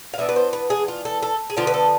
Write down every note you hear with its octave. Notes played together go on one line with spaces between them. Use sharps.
F5
E3 B3 D4 E5
B4
C5
B4
G#4
F4
A4
A4
G#4
D3 F3 B3 D4 F4
B4
A4